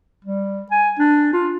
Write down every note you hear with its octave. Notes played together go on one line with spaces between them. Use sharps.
G3
G#5
D4
F4